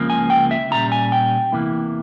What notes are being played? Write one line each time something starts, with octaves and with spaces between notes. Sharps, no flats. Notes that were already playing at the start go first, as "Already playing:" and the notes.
Already playing: C#2 C#3 F3 A#3
G#5
G5
E5
A#2 G3 C#4 A#5
G#5
G5
E2 C3 E3 A#3 E4